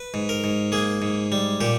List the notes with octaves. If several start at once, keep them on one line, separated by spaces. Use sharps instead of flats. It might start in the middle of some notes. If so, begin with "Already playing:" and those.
Already playing: B4
G#2
A#4
G#2
A#3 G#4
G#2
G3
A#2 G4